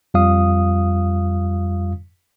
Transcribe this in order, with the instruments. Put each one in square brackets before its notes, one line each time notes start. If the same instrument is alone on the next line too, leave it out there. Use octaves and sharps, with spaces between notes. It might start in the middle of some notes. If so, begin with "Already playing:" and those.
[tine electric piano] F2 G3 F4 F5 D#6